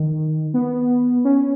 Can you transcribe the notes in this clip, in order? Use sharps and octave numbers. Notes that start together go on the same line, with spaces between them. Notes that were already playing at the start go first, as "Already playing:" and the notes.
Already playing: D#3
B3
C#4